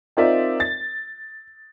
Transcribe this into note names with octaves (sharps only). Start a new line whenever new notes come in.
C4 D#4 F4 A#4 D5 E5
A6